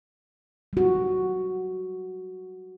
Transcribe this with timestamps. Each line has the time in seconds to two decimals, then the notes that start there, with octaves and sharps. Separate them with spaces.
0.73 G3 F#4